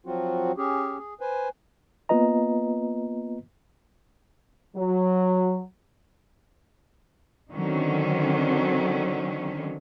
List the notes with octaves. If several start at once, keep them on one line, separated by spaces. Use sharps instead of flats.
F3 F#3 C4 F4 F#4
C#4 G4 G#4
G#4
B4 C5 G#5
A#3 B3 F4 B4 D#5 A#5
F#3
D3 D#3 F#3 C4 C#4